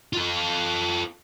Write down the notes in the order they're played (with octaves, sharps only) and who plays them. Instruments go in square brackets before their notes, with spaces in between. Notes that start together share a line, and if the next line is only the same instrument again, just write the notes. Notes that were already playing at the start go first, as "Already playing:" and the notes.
[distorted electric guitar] F4 A4